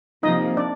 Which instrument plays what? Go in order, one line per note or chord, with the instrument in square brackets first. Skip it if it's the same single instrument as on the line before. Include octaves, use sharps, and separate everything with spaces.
[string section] C3 F3 A#3 [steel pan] D#4 D#5
[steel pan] D4 D5